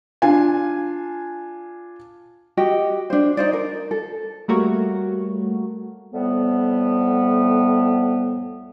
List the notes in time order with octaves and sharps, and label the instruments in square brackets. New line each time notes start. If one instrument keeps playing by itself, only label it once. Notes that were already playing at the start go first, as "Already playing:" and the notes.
[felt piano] D4 F4 G#5
[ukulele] F#4 G4 D#5
D4 C5
D#4 C5 D5
A#4
A4
[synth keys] G3 A3 A#3 F#4 A#4 C#5
[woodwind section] F2 A2 G3 B3